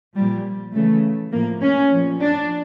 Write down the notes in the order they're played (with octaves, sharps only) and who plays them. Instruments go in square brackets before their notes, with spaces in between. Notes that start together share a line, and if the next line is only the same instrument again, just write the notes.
[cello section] A#2 F3 G3
C#3 E3 A3
A2 F3 A#3
C#4
A#2 F3
D4